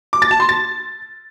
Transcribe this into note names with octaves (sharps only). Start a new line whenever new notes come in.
D6
A6
A5
C6
A6